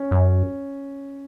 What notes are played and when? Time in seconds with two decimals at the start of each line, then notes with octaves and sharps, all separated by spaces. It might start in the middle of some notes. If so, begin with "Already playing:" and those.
Already playing: C#4
0.11 F#2